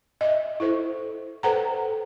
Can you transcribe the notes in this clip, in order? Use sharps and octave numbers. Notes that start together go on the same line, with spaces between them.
D#5 E5
E4 A4 C5
A4 B4 C5 F#5 G5 A#5